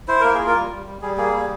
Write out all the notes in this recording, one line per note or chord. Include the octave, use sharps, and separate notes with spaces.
E4 C5
A#3 A#4
G#4
F4
A#4
G3
G3
G3
G3 G#4
A#3 G#4
G3